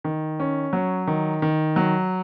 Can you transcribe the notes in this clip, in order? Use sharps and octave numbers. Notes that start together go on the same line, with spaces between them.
D#3
C#4
F#3
D#3
D#3
F#3